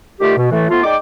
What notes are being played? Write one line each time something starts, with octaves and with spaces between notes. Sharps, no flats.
D3 D#3 A3 F4 G4
B2
A2 E3 A3
F3 A3 B3 F4
G#3 D#4 D5 G5 D6